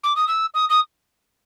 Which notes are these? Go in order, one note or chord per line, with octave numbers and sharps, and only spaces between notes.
D6
D#6
E6
D#6
D#6